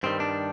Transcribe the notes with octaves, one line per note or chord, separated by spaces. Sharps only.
G2 D#3 G3 C4
D4